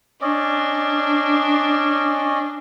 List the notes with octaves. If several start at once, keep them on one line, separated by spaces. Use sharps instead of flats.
C#4 D4 D5 D#5